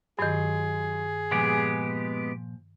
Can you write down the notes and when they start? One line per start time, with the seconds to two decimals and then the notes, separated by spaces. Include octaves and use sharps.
0.19 G2 D#3 F#3 F4 G#4
1.31 A#2 F3 G#3 B3 G4 G#5